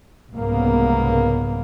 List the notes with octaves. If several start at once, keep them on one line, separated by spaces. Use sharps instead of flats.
C2 G#2 C#3 A#3 B3